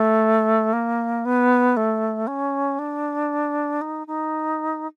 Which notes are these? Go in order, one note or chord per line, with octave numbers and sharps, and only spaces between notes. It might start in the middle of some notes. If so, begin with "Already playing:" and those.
Already playing: A3
A#3
B3
A3
C#4
D4
D#4
D#4